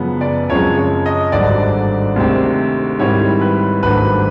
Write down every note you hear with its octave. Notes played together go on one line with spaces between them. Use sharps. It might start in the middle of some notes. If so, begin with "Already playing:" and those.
Already playing: F#2 C#3 F3 G#3 B3
D5
F#2 C#3 F3 G#3 C4 C#5
C#5
D#5
G#1 G2 D3 F#3 D5
D2 C3 D#3 G#3 C4
G#2 D#3 G3 C4 E4 C#5
B4
G#1 G2 D#3 F#3 A3 B4